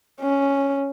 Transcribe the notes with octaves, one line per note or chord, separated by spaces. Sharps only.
C#4